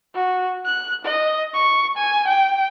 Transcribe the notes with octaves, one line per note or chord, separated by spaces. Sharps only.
F#4
F#6
D#5
C#6
G#5
G5